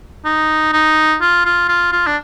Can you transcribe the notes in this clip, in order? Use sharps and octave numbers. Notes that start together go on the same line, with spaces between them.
D#4
D#4
F4
F4
F4
F4
D4